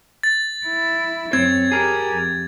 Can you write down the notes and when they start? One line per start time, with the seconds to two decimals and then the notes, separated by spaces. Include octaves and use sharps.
0.23 A6
0.66 E4
1.33 F#2 C4 C#5 G#6
1.72 G4 G#4 A#4
2.11 F2